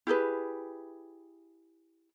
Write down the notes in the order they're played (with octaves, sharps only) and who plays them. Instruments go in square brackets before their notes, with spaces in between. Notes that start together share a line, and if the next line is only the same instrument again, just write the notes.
[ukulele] E4 G4 G#4 B4